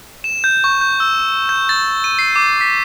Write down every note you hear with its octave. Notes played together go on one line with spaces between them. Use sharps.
E7
G6
C#6
G6
E6
G6
A6
D#7
C7
D6
B6